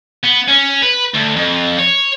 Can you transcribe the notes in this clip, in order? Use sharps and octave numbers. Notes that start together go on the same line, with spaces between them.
B3
C#4
B4
D2
F2
C#5